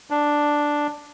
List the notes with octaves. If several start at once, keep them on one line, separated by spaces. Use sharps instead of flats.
D4